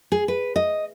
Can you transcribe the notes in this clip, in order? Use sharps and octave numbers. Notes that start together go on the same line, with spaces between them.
G#4
B4
D#5